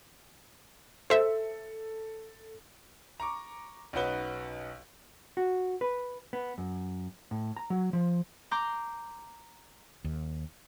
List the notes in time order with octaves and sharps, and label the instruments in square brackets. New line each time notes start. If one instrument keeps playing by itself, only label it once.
[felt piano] A4 [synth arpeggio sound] C5 E5
[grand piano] A#5 C#6 D6
B1 C#4 D#4 F#4 B4 G7
[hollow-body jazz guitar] F#4
B4
B3
F#2
A2
A#5
F#3
F3
[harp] A#5 C6 D6 G6
[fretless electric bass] D#2